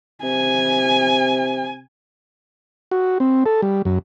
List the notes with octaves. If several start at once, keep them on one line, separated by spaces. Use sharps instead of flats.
C3 G#5
F#4
C4
A4
G3
F#2